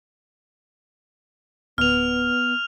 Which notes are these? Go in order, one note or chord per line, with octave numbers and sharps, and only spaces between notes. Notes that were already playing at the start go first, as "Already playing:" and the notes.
D1 B3 F6 F7